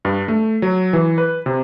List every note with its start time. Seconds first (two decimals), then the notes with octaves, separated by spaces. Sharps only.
0.05 G2
0.28 A3
0.62 F#3
0.93 E3
1.18 B4
1.46 C3